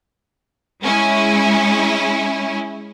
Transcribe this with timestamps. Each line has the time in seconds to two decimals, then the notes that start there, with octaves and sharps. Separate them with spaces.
0.83 G#3 C#4 E4